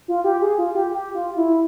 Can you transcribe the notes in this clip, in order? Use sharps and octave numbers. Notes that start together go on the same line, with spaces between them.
F4
G4
G#4
F4
G4
G4
F4
E4